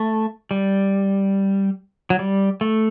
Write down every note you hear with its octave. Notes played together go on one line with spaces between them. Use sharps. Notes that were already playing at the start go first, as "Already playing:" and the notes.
Already playing: A3
G3
F#3
G3
A3